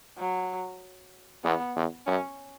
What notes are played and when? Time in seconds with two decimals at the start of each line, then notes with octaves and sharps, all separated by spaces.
0.18 F#3
1.44 E2 B3
1.76 E2
2.07 F#2 C#4